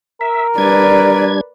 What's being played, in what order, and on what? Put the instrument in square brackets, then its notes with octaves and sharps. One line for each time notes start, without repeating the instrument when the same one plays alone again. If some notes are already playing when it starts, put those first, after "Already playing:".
[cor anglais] A#4 [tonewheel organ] E5
[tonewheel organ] G3 D4 G#6 [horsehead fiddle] B4 D5